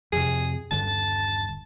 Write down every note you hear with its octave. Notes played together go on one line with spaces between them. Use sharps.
F2 C3 G#4
D#1 G2 D3 A5